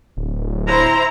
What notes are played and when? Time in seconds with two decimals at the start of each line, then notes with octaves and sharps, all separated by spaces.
0.17 D1
0.68 E4 C5 A#5